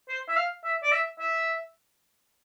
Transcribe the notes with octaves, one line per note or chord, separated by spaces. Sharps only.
C5
E5
F5
E5
D5
E5
E5